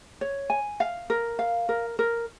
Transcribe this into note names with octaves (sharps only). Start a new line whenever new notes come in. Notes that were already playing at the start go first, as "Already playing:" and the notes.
C#5
G#5
F5
A#4
F5
A#4
A#4